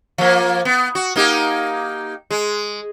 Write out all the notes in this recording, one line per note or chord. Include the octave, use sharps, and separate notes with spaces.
F3 A#3
B3
F#4
A#3 D#4 G4
G#3